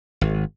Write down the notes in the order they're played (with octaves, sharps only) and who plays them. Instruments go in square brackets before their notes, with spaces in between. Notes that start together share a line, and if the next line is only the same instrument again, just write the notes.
[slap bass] G#1